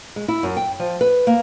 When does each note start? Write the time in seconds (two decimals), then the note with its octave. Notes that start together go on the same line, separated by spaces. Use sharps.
0.16 G#3
0.28 E4
0.43 F#2
0.57 G5
0.80 F3
1.01 B4
1.27 A#3